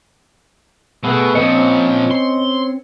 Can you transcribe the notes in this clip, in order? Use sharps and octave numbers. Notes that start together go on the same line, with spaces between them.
B2 A3 B3 G#4
A#2 F3 C4 C#4 D#5 C#7
C6